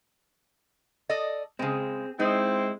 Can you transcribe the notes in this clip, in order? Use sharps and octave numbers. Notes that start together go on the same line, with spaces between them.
A4 D5 D#5
C#3 G#3 C4 G#4
G#3 C4 D#4 E4